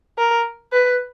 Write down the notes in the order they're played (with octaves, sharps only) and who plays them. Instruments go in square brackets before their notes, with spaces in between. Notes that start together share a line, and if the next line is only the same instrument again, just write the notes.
[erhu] A#4
B4